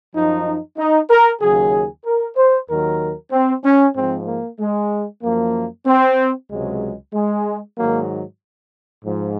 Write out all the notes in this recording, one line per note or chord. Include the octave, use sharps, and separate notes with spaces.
F#2 F3 D#4
D#4
A#4
D#2 C#3 F#3 G#4
A#4
C5
D#2 D#3 F#3 A#4
C4
C#4
G#2 F3 C4
A#3
G#3
F#2 F3 A#3
C4
C#2 C3 F#3 G#3
G#3
G#2 D#3 F#3 A#3
G#2 F3